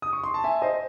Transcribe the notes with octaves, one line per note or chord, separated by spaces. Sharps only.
D#6
C#6
C6
A5
E5 G#5
C5 D#5